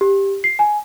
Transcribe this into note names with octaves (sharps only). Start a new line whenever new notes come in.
G4
C7
G#5